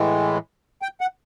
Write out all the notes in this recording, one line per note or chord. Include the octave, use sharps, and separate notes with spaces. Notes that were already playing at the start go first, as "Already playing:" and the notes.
Already playing: A2 E3 G#3
G5
F#5